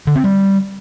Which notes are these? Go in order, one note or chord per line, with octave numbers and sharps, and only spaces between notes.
D3
C4
G3